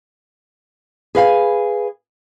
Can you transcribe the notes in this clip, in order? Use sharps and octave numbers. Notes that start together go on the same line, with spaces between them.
G#4 B4 F5 G#5